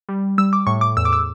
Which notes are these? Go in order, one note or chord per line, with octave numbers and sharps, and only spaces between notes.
G3
G3 E6
D6
A2 C#6
D6
E2 E6
D6
E6